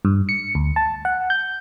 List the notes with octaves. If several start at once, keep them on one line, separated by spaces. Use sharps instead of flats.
G2
C#7
D2
A5
F#5
G6